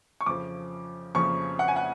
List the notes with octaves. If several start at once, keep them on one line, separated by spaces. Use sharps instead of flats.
C#6
F2 C#3 F3 D6
F2 C#3 F3 C#6
F#5
G#5
F#5